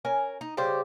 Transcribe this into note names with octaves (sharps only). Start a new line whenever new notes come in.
C#4 A#4 G#5
D#4
C#3 G3 G4 C5